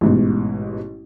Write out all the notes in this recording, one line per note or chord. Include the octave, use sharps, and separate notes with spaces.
A1 G#2 B2